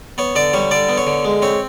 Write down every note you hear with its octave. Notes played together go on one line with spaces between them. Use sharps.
B3 C#5
D3 D5
G3 C#5
D3 D5
B3
C#5
D3
G#3
C4 C#5